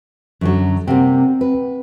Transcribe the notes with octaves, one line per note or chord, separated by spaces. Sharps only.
F#2 D3 F#3
C3 G3 A#3 C4 F#5 G5
B4